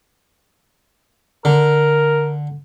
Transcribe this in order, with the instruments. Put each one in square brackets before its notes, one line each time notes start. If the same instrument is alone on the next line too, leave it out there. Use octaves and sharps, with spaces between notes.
[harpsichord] D3 [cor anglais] A#4